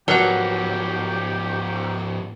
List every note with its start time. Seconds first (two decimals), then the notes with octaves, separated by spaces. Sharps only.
0.08 G#2 F3 F#3 G4 A#4 B4 F#5